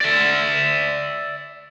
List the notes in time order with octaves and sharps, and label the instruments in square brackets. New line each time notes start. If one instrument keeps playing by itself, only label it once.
[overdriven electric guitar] D5 E5